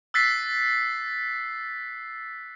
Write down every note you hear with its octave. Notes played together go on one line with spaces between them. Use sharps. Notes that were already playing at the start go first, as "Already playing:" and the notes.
E6 F#6 A6 B6 C7